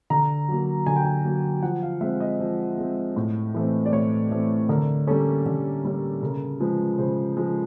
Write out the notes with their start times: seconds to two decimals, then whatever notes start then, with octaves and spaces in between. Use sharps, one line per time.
0.10 D3 A#5
0.48 F#3 A#3
0.86 D3 G#5
0.96 G5
1.05 G#5
1.25 F#3 A#3
1.63 F3 F#5
1.83 F5
2.01 G#3 C4 E5
2.21 D#5
2.40 F3
2.78 G#3 C4
3.16 A2
3.54 E3 A3 C4
3.85 D5
3.93 A2 C#5
4.31 E3 A3 C4
4.69 D3 A#4
5.07 G3 A#3 C#4 A4
5.46 D3
5.85 G3 A#3 C#4
6.23 C#3 A#4
6.60 F3 G#3 B4
6.98 C#3 C5
7.37 F3 G#3